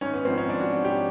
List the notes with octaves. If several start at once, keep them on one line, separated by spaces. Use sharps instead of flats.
G#1 C#4
B3
G#2 F3 C4
C#4
G#1 D4
F#4
G#2 F3
G4